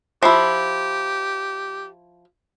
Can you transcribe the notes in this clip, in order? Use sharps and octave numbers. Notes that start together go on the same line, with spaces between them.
F3 E4 G4